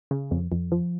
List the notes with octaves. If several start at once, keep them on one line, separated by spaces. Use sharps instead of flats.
C#3
F2
F2
F3